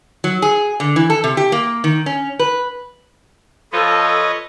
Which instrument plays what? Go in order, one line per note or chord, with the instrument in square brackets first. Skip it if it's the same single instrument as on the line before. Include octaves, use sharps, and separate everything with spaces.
[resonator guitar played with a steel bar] F#3
G#4
D3
E3
A4
C3
G4
A#3
D#3
C#4
B4
[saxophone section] F3 [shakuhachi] A4 [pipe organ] B4 C#5 D#5